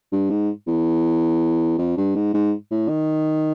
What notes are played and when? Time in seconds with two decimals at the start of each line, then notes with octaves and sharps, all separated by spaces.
0.12 G2
0.30 G#2
0.67 E2
1.78 F2
1.97 G2
2.16 G#2
2.34 G#2
2.71 A2
2.89 D#3